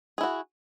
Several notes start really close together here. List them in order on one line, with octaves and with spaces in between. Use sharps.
G#4 E4 F#4